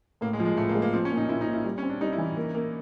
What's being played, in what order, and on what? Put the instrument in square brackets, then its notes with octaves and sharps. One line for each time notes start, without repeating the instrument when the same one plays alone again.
[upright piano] A2 [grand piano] A#3
[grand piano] G#3
[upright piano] F3
[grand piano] G#3
[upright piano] A2 [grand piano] A3
[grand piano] A#3
[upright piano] G#3
[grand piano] A#3
[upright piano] F3 [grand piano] C4
[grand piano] C#4
[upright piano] A#2
[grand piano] D#4
[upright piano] A#2 [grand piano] E4
[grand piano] D#4
[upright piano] A#2
[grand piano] E4
[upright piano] G3
[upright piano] C4 [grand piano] C#4
[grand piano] D4
[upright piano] G3 [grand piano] D#4
[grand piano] E4
[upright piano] E3
A#3
A#3